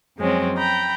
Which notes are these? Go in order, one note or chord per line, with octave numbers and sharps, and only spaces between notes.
F#2 F3 G#3 C4 C#4
G5 A#5 B5